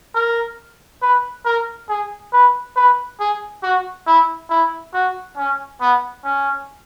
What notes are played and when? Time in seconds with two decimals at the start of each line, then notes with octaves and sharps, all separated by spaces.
0.15 A#4
1.02 B4
1.45 A#4
1.89 G#4
2.32 B4
2.76 B4
3.19 G#4
3.63 F#4
4.06 E4
4.50 E4
4.93 F#4
5.37 C#4
5.81 B3
6.24 C#4